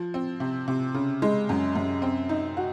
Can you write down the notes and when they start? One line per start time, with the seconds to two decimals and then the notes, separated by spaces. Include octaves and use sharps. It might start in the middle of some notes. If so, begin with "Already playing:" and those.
Already playing: F3
0.14 C4
0.40 C3
0.68 C3
0.94 C#3
1.22 G#3
1.49 F#2
1.75 F#2
2.02 C4
2.29 D#4
2.57 F#4